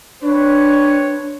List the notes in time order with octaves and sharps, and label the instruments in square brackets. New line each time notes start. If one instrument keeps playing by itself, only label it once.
[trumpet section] C4 B4 C#5 [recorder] D4